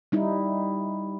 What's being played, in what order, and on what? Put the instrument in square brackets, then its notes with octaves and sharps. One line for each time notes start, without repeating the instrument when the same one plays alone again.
[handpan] G3 D#4 E4